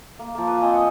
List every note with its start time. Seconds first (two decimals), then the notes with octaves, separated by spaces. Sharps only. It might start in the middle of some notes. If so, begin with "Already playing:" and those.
0.19 A#3
0.35 F3 A#3
0.48 B4
0.61 C4 D#5 G#5 D#6
0.73 F#5